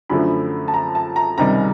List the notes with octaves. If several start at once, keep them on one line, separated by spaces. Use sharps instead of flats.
F#2 D3 F3 A3 B5
A5
A#5
A5
A#5
C#2 C3 D#3 G3 A#5